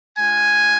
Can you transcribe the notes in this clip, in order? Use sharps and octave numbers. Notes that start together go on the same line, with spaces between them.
G#3 D4 F4 G#5